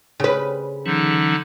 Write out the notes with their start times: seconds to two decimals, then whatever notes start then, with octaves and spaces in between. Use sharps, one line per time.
0.20 C#3 B4
0.86 D3 E3 F#3 C#4 D#4